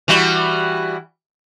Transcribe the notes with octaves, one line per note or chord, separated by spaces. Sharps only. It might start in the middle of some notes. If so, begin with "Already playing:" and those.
E3 G3 F#4